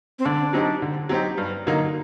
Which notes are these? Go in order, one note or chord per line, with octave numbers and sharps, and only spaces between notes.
C4
D3 D4
F#3 C4 D#4 G4
D3
F#3 C4 D#4 G4
G2
D3 F#3 A#3 D#4